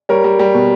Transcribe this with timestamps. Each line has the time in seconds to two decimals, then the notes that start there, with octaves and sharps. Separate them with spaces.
0.09 G3 A#4 C#5
0.24 G3
0.39 G3
0.54 B2